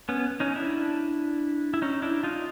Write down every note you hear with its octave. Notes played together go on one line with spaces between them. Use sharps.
B3 C#4
C#4 D#4
D4 E4
E4
C#4 D#4
D4 E4
D#4 F4